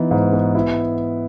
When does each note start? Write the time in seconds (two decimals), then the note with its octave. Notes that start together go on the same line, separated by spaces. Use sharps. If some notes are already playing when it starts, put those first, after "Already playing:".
Already playing: E3 B3 D#4
0.11 G#2
0.33 B3
0.55 E4